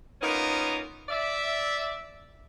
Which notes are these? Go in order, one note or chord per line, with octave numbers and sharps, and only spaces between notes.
A#3 B3 C#4 D#4 F4 A#4
D5 E5